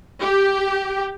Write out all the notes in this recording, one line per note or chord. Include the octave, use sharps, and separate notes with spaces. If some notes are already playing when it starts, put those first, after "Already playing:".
G4